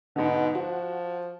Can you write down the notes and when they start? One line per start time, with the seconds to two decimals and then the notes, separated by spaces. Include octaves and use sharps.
0.16 G#2 B2 D3
0.55 F3 F#4